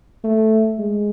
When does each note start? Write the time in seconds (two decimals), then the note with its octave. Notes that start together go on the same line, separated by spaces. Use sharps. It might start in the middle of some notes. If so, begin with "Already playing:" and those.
0.24 A3
0.79 G#3